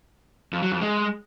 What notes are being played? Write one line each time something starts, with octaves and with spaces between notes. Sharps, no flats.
F2
F#3
F2
G#3